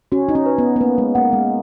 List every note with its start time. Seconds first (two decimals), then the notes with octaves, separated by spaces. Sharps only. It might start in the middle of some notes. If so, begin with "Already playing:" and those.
0.12 C#4 F#4
0.29 D#4
0.35 C#4
0.46 B4
0.58 B3
0.76 B3
0.80 A#3 B4
0.98 G#3
1.15 A#3 F#5
1.33 G#3